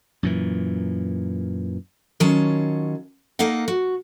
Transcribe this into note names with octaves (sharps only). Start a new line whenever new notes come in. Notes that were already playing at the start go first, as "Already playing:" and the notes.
F#2 A#2 E3
D#3 F#3 C#4 F4 A5
A#3 D#4 A4 F5 F#5
F#4